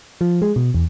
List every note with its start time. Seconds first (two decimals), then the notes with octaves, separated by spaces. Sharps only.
0.21 F3
0.42 G#3
0.56 B2
0.74 E2